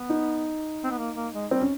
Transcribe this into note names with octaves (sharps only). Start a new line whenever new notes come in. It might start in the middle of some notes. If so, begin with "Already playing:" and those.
Already playing: B3
D#4
C4
B3
A#3
A#3
G#3
G3 C4
C#4